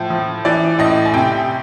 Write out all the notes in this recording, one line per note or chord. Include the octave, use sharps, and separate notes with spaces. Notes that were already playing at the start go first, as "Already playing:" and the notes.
Already playing: A2 F3
F3
E3 D5
A2 D#5
G#5
C3 G5